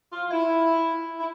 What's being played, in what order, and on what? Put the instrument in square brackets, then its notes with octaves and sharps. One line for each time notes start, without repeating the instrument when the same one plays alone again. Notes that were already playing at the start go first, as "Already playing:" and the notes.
[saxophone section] F4
E4
E4